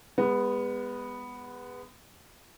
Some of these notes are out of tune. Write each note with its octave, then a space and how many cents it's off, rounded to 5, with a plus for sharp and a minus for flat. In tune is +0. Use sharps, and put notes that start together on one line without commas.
G#3 -30 B3 +0